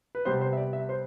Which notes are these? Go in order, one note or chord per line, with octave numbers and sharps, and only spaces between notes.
B4
C3 G3 B3 C5
C5
E5
D5
E5
C5